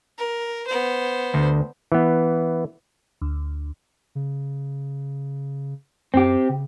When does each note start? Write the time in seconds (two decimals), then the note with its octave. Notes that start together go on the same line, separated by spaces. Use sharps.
0.18 A#4
0.67 B3 C5
1.34 D2
1.92 E3 B3
3.22 D2
4.15 C#3
6.14 F#2 C4 G4
6.49 C#3